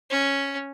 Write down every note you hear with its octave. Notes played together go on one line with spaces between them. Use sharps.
C#4